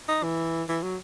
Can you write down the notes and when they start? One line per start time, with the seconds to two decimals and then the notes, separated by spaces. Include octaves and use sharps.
0.08 D#4
0.23 E3
0.69 E3
0.83 F#3